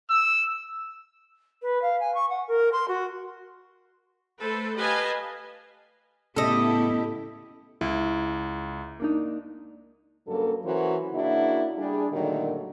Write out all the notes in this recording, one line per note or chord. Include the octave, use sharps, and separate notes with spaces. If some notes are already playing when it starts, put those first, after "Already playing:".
E6
B4
F5
G#5
C#6
F#5
A#4
C6
F#4
A3 A4 B4 C5
G4 B4 D#5 F5 G#5 A5
A2 C#3 B3 E4 G4 A4 D#5
C#2 E4
A#3 D4 D#4
G2 C#3 F#3 A#3 A4
E3 F#3 C#4 F#4 A#4 C5
C#3 A#3 D4 E4 F#4
G3 D4 G#4
A#2 D3 D#3 F#3 G3 A3